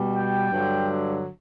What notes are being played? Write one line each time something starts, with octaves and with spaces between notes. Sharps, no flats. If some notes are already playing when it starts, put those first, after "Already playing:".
Already playing: B2 G3
G5
G2 D3 F#3